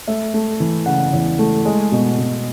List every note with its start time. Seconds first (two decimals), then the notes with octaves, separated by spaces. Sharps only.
0.08 A3 E5
0.34 A3
0.60 E3
0.86 C#3 F#5
1.13 E2
1.39 A3
1.65 G#3
1.92 B2
2.18 B2